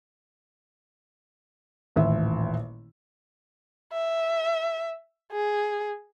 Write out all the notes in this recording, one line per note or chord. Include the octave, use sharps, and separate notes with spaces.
D#1 A1 E5
E5
G#4